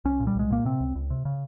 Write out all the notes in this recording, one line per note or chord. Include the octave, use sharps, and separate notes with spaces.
C2 C#4
A#2
G3
C2 G#3
A#2 A#3
C3 C4
C#2
C#2
C3
C#3